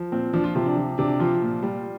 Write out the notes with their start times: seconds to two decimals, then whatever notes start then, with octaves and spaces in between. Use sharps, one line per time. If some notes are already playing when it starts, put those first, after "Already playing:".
Already playing: F3
0.12 A#2 C4
0.33 F3 D4
0.44 F4
0.55 C3 F4
0.66 D4
0.77 F3
0.98 C3 D4
1.20 F3 F4
1.42 A#2
1.63 G3